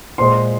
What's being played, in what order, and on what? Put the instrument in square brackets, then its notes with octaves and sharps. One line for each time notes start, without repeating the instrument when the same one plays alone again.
[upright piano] A#2 G#3 C5 C6